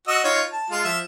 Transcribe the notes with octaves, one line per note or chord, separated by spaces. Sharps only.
F#4 D#5 E6
D#4 F4 C#5
A5
G#3 F4
F3 E5